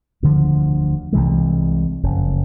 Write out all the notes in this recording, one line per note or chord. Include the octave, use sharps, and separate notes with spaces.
E1 D2 D3 F3
C2 C3 E3 G#3
F#1 F2 C#3